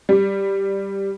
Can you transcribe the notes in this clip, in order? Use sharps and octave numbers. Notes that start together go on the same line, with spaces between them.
G3